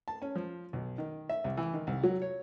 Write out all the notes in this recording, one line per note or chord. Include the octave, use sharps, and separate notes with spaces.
A5
C#4
F3
B1
D#3
E5
C2
E3
D#3
C2
F#3
C#5